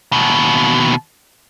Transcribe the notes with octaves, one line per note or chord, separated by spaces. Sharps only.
D#2 B2